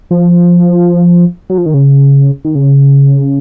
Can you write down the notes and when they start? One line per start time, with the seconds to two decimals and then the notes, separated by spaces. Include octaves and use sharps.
0.11 F3
1.50 F#3
1.58 F3
1.66 D#3
1.74 C#3
2.45 D#3
2.55 C#3